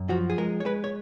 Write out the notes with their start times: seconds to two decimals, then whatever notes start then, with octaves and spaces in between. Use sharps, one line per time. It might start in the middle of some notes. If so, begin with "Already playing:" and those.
Already playing: F#2
0.09 F3 F#4
0.30 G#4
0.38 G#3 A#4
0.60 C#5
0.65 G#3 B4
0.84 C#5